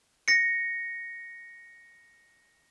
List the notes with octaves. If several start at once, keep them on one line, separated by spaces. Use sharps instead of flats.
A#6 C#7